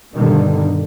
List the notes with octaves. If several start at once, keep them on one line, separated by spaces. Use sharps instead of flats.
G2 B2 D3 D#3